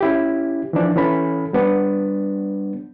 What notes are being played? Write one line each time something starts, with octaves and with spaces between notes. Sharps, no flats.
C#4 E4 G4
E3 F3 D4
E3 C#4 A4 B5
G3 B3 D4